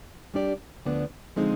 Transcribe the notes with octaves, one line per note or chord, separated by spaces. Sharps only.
G3 D4 G4 D5
D2 D3 F3 B3 D4
D3 F3 G#3 C4 D#4